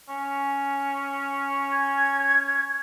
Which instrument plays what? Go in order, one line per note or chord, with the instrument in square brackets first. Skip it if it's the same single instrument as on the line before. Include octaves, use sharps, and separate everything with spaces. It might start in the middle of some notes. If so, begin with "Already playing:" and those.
[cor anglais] C#4
[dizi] G#6